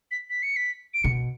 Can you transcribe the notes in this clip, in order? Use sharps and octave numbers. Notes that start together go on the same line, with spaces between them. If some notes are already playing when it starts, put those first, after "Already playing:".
B6
B6
C#7
B6
D7
B2 C#7